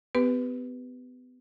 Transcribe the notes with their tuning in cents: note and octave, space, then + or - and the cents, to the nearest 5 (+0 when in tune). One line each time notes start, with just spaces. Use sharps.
B3 +30 G4 +0 B4 +0